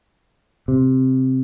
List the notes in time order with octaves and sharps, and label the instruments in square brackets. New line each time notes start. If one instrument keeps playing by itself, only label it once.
[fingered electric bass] C3